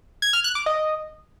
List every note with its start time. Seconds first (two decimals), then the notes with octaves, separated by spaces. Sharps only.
0.22 G#6
0.33 F6
0.44 F#6
0.55 D6
0.66 D#5